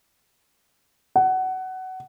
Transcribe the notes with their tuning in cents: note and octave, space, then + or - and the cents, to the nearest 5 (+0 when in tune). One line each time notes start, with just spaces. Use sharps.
F#5 +20